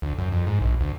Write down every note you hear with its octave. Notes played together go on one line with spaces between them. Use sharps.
D2
F#2
F2
G#2
A#1
D2